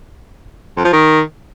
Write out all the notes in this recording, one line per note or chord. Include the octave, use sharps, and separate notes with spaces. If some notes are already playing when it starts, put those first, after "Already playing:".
F2
F3
D#3